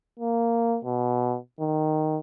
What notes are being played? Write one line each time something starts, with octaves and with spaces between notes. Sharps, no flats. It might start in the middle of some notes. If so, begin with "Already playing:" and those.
A#3
B2
D#3